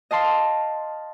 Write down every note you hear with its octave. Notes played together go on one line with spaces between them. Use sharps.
D#5 F5 A5 C6